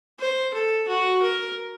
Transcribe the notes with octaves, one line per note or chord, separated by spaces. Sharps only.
C5
A4
F#4
A#4